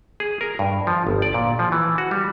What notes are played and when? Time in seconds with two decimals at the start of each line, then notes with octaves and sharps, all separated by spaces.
0.20 G#4
0.41 A#4
0.59 G2
0.87 F3
1.07 G1
1.22 D5
1.34 A#2
1.59 F3
1.72 E3
1.98 F#4
2.11 G3